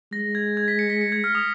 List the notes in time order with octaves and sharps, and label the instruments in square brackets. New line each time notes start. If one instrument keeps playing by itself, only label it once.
[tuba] G#3 [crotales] A#6
[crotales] G#6
G#6
B6
C#7
B6
C#7
G#6
F6
D#6